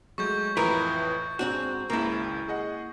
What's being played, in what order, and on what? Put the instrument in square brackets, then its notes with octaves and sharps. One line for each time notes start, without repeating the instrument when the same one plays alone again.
[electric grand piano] F#3 G#3 A3 [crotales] C#6 G6
[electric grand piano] F2 A2 E3 [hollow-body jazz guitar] E4 F4 A#4
[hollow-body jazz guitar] G#2 C4 F#4 [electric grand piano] D4
[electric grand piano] G#1 C#2 C#3 [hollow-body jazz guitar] A#3 E4
[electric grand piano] G#4 D#5 F#5